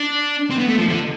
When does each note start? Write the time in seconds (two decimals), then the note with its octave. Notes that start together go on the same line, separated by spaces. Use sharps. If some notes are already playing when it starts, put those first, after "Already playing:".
Already playing: D4
0.50 C4
0.58 B3
0.68 A3
0.78 F3
0.88 D3